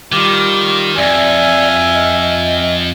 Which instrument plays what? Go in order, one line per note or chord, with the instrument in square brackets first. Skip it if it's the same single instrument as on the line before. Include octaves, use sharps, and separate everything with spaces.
[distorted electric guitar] D#3 [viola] G3 F4 [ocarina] D6
[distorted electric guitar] F2 [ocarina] D5 [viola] E5 G#5
[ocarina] D#5